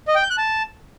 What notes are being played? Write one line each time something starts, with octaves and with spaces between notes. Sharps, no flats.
D#5
G5
G6
F#6
A5